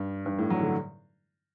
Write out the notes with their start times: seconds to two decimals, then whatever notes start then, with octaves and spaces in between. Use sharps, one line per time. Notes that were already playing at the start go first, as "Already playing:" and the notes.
Already playing: G2
0.26 G2
0.39 A2
0.50 F#3
0.61 D3